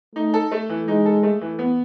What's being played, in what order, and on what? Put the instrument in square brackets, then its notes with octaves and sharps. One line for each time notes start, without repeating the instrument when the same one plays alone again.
[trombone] A3 [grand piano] D#4
[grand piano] A4
A3
E3
[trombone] G#3 [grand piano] D#4
[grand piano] A4
A3
E3
B3